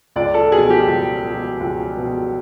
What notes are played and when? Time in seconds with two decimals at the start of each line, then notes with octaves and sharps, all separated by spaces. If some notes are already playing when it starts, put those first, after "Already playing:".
0.16 C#2 D5
0.34 A4
0.52 B2 G#4
0.70 G4
0.88 C#2
1.25 B2
1.60 C#2
1.97 B2